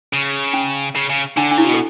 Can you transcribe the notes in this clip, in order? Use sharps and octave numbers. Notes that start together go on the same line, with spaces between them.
C#3
C#4
C#3
C#3
D3 D4
D4
C#3 E4
B2 F#4
A4